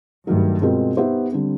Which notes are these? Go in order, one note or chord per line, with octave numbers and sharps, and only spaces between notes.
G2 D#3 F#3 A3
B2 G#3 C4 F4 A#4
B3 D#4 G4 C5 E5
D3 G3 C4